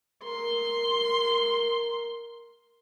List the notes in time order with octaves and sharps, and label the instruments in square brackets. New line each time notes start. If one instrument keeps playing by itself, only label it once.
[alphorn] A#4 [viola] C6